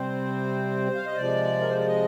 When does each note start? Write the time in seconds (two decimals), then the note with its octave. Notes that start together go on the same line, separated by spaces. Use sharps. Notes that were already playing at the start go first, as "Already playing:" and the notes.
Already playing: C3 G3 C4 C5
0.95 F5
1.06 D#5
1.16 C3 F3 G#3 D5
1.61 A#4
1.69 C5
1.78 D5
1.86 D#5